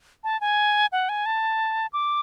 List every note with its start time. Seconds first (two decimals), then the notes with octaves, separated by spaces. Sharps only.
0.24 A5
0.41 G#5
0.92 F#5
1.09 G#5
1.26 A5
1.93 D6